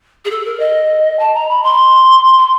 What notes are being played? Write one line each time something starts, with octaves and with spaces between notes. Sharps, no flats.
G#4
A4
A#4
D#5
A5
A#5
B5
C6
C6